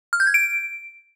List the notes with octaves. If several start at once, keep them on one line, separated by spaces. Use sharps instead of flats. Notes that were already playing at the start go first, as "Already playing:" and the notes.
F6
G6
G#6
D7